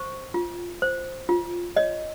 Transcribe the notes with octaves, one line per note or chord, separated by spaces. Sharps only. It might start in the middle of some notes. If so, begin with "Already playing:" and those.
Already playing: C5 C#6
F4
C5
F4
C#5 D#5